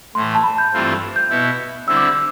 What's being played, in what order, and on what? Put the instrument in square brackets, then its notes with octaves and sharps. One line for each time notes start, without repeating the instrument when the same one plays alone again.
[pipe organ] A2 E3 A3 [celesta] C6
[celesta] A5
B5
G6
[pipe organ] G2 E3 A3 C4 F4
[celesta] G6
[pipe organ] B2 B3 E4
[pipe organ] D3 G3 C4 E4 [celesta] E6
[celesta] D6
E6